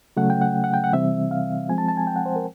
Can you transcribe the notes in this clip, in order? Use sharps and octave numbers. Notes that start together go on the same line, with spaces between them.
C#3 F#3 A3 C#4 F#5
G5
F#5
F#5
G5
F#5
C3 E3 G3 C4 E5
F5
F3 G#3 C4 G#5
A5
A5
G#5
G5
F#5
C5
A#4